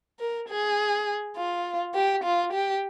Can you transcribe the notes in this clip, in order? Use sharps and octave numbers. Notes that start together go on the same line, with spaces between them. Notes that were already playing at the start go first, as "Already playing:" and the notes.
A#4
G#4
F4
G4
F4
G4